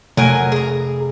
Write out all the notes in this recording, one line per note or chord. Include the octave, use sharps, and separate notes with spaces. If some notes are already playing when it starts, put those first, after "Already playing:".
F1 F#3 A#4 G#5
G#4 A#5